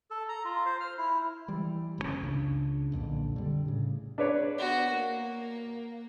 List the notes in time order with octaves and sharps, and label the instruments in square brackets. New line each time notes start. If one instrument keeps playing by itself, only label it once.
[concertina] A4
A#5
F4
C5
F6
E4
[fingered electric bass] E3 G3
F#1 C#3 C#4
C#2 C#3 D4
B1 F2 A#2 D3
D3 G3
A2 C#3
[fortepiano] D4 B4 C#5
[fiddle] B3 F#4
A#3